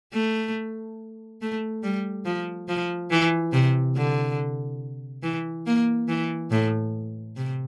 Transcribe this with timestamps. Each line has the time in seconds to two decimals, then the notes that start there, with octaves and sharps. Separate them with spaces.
0.13 A3
1.41 A3
1.83 G3
2.26 F3
2.68 F3
3.11 E3
3.53 C3
3.96 D3
5.23 E3
5.67 A#3
6.08 E3
6.51 A2
7.36 C3